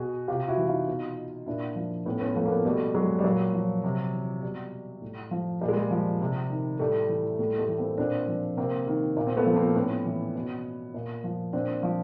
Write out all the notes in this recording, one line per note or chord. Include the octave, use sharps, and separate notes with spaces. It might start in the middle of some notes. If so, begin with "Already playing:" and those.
Already playing: B2 F#4 G#4
C3 F4 G4
E4 F#4
E3
D#4 F4
B2
A#2 D4 E4
F3
A2 B3 C#4
B3 C#4
F3 A3 B3
A#3
A3 B3
B2 G3 A3
F#3 G#3
G3
A#2 F#3
F3
C3
E3
B2 G3
A2
F3
A#2 G3
G#3
G3
F3
C3
D#3
A2 G3 A3
E3
A2 G3 A3
G3 A3
E3
A#3 C4
A#2 C4 D4
F3
C3 A#3 C4
D#3
A#2
C4
A3 B3
F3
A#3 C4
A2 B3 C#4
E3
B2
A#2
F3
A#2 C4 D4
F3